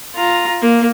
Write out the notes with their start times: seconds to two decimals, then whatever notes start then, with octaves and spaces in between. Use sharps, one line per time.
0.15 F4 A#5
0.62 A#3